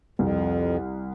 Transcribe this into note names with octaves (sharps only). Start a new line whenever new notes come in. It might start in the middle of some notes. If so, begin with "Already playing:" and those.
C2 F2